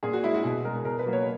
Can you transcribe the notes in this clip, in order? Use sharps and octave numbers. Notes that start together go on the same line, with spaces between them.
A#2 G#4
F#4
G#3 E4
F#4
B2 G#4
G#3 A#4
B2 A#4
B4
F#3 A#3
C#5